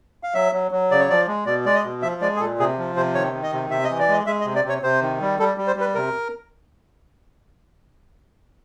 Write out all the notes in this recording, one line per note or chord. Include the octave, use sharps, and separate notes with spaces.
F5
F#3 E5
F#3
F#3
C#3 D5
C#5
F3 D5
G#3
B2 D5
G#3 D5
D#5
B2
F3 E5
G#3 D5
G#4
A#2 A4
C3 G#4
F3
C3 C5
D#3 C#5
D#3
D#5
C3
C3 E5
D#5
E3
D5
G#3 D#5
G#3 E5
D#5
C3
D5
C3 C#5
C3 C5
D#3
G3
G3 A4
G3
C5
G3 B4
C3 A#4